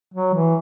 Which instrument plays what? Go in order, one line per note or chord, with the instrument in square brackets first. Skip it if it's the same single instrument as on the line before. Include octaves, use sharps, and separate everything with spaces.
[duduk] F#3
E3